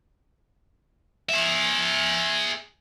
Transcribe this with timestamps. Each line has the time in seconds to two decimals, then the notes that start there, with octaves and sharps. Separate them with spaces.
1.29 G#4 E5